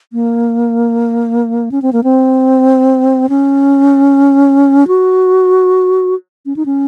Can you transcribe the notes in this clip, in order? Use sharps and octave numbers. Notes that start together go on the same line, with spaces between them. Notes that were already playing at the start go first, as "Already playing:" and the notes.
A#3
C#4
C4
A#3
C4
C#4
F#4
C#4
D#4
C#4